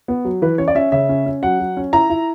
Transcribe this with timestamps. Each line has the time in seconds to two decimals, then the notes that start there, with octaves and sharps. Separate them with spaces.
0.08 B3
0.25 F#3
0.42 E3 B4
0.58 C#4 C#5
0.68 D5
0.75 C#4 E5
0.92 C#3 E5
1.09 C#4
1.26 C#4
1.43 F#3 F#5
1.60 F#3
1.77 C#4
1.93 E4 A#5
2.10 E4